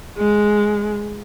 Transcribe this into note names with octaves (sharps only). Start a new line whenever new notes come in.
G#3